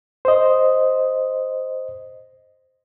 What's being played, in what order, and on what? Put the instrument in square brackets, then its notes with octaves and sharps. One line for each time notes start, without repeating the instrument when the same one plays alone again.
[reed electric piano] C5 D#5